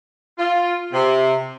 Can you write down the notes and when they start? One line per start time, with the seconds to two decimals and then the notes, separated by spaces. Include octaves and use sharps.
0.38 F4
0.93 C3